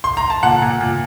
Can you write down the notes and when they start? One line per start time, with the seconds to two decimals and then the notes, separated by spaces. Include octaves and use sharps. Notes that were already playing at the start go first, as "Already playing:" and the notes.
0.04 C6
0.17 A#5
0.30 A5
0.43 A#2 F#5
0.62 A#2
0.81 A#2